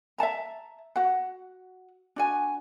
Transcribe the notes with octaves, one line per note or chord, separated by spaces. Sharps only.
E5 F#5 A5 A#5
F#4 F#5
D4 F#4 G#5